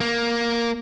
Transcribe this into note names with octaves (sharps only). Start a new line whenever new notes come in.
A#3